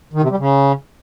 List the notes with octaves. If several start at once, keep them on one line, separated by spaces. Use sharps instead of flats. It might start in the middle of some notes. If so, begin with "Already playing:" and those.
D#3
C3
G3
C#3